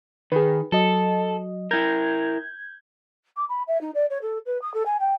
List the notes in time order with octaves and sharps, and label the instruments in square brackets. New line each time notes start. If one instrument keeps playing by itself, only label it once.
[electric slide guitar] D#3 [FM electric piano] G#4 B4
[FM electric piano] F#3 D#5 [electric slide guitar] A4
[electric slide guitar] E4 A#4 [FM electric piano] G6 G#6
[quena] D6
B5
E5
D#4
D5
C#5
A4
B4
D#6
A4
G#5
G5